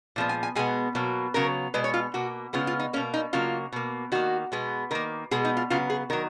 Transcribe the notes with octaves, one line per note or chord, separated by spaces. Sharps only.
A#2 F3 G#3 B3
G#5
G#5
B2 G#3 B3 G#5
B2 F#3 A#3
C#3 F#3 B3 A#4
B2 G#3 B3 B4
C#5
F4
B2 A#3 F#4
C#3 G#3 B3 F4
F4
D#4
B2 A#3 C#4
D#4
C#3 F#3 A#3 F4
B2 A#3
D#3 A#3 F#4
B2 G#3 B3
D#3 A#3 A#4
B2 G#3 B3 G#4
D#4
F4
C#3 F#3 B3 F4
G#4
D#3 F#3 A#4